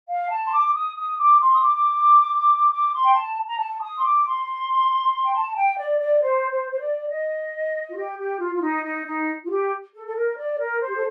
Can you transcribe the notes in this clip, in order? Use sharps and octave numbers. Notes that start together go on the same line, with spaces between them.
F5
A5
C6
D6
D#6
D#6
D6
C6
D#6
D6
D6
C6
G5
A5
A#5
A5
D#6
C6
D6
C6
G5
A5
G5
D5
D5
C5
C5
C5
D5
D#5
F4
G4
G4
F4
F4
D#4
D#4
D#4
F4
G4
A4
A4
A#4
D5
A#4
C5
G4
A4